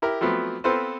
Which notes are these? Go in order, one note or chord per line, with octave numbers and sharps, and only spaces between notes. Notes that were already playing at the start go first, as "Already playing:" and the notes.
E4 G4 A#4
F3 F#3 A3 B3 C4
B3 C4 F4 A4 B4 C5